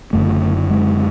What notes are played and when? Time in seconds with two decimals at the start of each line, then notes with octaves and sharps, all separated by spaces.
0.13 F#1 F#2 D3 A3
0.70 G#3